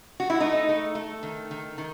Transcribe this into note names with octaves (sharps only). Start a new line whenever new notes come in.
F#4
E4
A3 D#4
A3
A3
D#3
D#3
D#3